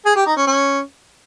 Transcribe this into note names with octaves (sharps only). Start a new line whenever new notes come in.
G#4
G4
D#4
C#4
C#4